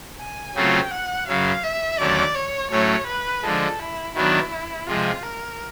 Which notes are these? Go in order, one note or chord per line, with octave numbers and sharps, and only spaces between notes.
G#5
C#3 F#3 A3 C4 F4 G5
F#5
F#2 C#3 F#3 F5
E5
D#2 D3 F#3 A3 C#4 D5
C#5
A2 F#3 A3 C#4 C#5
B4
D3 F3 G#3 A4
E4
D#3 F#3 B3 D4 E4
C3 F3 G#3 F4
A#4